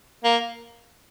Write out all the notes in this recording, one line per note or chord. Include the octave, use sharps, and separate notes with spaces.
A#3